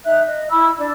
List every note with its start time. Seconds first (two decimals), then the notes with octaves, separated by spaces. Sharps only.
0.04 D#4 E5 F#6
0.25 D#5
0.50 E4 B5 E6
0.78 D4